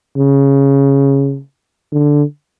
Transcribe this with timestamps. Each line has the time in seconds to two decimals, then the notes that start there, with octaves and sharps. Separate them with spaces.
0.17 C#3
1.92 D3